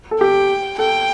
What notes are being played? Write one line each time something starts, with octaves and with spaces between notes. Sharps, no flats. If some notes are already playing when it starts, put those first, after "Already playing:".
A4
G4 G5
A4 G5